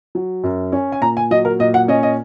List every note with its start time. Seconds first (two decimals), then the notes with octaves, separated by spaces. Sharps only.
0.15 F#3
0.44 F#2
0.72 C#4
0.92 G#5
1.01 A#2 A#5
1.17 G#5
1.31 F#3 D#5
1.45 A#4
1.59 A#2 D#5
1.74 F#5
1.88 C#4 D#5
2.03 D#5